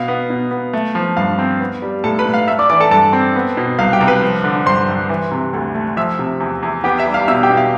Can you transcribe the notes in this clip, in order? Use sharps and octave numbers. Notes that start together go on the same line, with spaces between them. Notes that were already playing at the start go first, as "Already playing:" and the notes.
Already playing: B2 F5
B3
B2
B3
A3
F3
G2 F5
C4
B3
G3
A2 A4 A5
B4 B5
A2
F5 F6
A3 E5 E6
D5 D6
E3 D5 D6
A4 A5
G2 A4 A5
C4
B3
B2
C2 F5
G4 G5
C2
B4 B5
F3
D3
G2 C5 C6
G2
E3
C3
D2
A3
F3 E5 E6
C3
E2
E2
B3 G4 G5
E5 E6
G3
F5 F6
B2 E5 E6
G4 G5
B2
F5